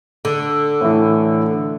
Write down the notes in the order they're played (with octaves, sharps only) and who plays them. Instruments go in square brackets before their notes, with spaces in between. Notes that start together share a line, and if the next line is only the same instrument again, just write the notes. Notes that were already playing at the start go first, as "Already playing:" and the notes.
[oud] D3
[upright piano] A2 E3